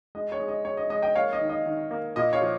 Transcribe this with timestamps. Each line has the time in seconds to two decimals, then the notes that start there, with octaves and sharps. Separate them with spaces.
0.15 G#3 D#5
0.32 C#5
0.40 G#3
0.48 D#5
0.65 G#3 C#5
0.77 D#5
0.90 G#3 D#5
1.02 D#5 G5
1.15 A#3 C#5 F5
1.33 D#5
1.41 D#3
1.49 D#5
1.66 D#3
1.91 A#3
2.16 A#2 D#5
2.33 C#5 F5
2.42 F3